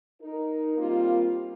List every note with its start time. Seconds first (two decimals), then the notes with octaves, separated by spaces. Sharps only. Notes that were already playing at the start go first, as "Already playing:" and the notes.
0.21 D#4 A#4
0.78 G3 A#3 C4 F4